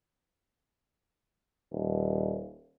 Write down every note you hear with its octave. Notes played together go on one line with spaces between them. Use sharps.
D#1